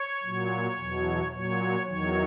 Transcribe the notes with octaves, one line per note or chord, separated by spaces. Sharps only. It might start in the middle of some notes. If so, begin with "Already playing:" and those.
Already playing: C#5
A#2 F#3
E2 B2 F#3
A#2 F#3 C#5
E2 D#3 F#3 C#5